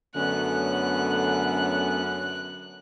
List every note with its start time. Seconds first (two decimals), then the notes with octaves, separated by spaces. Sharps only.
0.15 F#2 D3 A3 B3 C#4 F#6